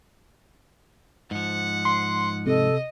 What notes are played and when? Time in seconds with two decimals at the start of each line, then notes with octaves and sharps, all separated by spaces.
1.31 G#2 F3 F#5
1.85 C6
2.47 C3 A4 D#5